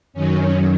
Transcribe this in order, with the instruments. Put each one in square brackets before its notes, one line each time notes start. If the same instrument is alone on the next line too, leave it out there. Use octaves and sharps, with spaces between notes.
[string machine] F#2 D#3 F#3 C#4